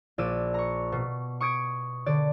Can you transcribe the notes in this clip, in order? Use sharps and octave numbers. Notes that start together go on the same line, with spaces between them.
A#1 D5 E6 D#7
A#5 C#6
B2
C#6 D#6 G#6 D7
D3 D5